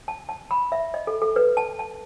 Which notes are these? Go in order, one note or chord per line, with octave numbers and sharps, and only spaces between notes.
A5
A5
B5
E5
D#5
A4
A4
B4
A5
A5